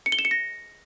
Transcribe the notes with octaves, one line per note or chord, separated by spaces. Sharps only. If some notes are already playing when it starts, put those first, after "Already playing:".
C#7
G7
E7
C#7
A#6